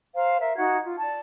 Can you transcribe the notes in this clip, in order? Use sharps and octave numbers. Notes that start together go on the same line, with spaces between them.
C5 F5 A#5
A#4 E5
D#4 F#4 F#5 G#6
F4
D5 A5